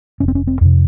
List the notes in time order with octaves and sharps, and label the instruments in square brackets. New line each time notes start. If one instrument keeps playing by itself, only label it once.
[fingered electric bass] F1 C#4
C4
C#4
C4
F2 C3